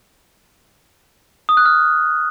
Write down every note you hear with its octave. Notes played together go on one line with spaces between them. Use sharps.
D#6
F#6
F6